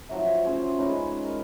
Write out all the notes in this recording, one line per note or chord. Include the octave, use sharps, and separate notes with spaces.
F3 F#3 E5
C#4 G#4 C5
G#3 C#4 D#4 B4
A#4